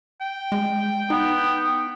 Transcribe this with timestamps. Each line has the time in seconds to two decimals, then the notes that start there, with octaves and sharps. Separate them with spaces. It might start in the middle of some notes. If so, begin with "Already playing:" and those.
0.21 G5
0.52 G#3
1.10 B3 D#4